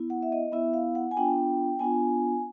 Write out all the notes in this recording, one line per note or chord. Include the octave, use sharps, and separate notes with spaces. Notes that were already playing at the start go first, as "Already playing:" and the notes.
Already playing: B3 E4
F#5
E5
D#5
B3 E4 E5
F5
F#5
G#5
B3 D4 F4 G5
B3 D4 F4 G#5